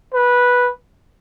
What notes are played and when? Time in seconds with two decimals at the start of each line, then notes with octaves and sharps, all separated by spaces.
0.14 B4